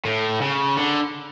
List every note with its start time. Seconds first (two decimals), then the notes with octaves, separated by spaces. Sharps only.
0.05 A2
0.41 C#3
0.77 D3